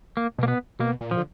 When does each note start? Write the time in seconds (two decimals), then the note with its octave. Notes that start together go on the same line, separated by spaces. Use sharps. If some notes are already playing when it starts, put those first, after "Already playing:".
0.17 A#3
0.38 B2 A#3
0.48 B3
0.79 B2 A#3
1.01 A#2
1.11 F3
1.17 D3